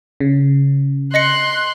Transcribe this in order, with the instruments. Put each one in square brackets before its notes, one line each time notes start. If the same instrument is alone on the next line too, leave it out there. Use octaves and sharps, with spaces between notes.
[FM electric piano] C#3
[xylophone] D#5 A#6 C#7 [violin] C6 F#6